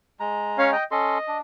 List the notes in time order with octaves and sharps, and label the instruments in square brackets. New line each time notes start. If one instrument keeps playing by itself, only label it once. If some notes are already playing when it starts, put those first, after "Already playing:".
[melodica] G#3 A#5
[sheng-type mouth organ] C#4 C#5 F5
D#5 G5
[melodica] C#4 A4 C6 [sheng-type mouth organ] D#5
[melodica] D4